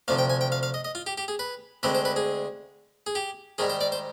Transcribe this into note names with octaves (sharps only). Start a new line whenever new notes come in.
D2 C3 F3 F5
G5
G#5
G5
F5
F5
D#5
D#5
F4
G4
G4
G#4
B4
D2 D3 G#3 C4 B4
C5
B4
G#4
G#4
G4
G#2 D#3 G3 G#4
C5
D5
C5